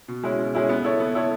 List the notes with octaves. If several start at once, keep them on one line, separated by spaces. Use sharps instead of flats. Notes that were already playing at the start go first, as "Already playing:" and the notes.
B2
G#3 C#4 E4
B2
G#3 C#4 E4
B3
E4 A4 C#5
B3
E4 A4 C#5